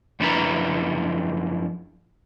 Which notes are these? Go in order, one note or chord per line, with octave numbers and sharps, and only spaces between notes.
F#2 F3 D4 E4 B4 A#5